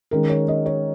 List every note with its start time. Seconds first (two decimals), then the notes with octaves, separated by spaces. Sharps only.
0.11 D#3 G#3 C#4 A#4
0.29 C#5
0.48 D#5
0.66 C#5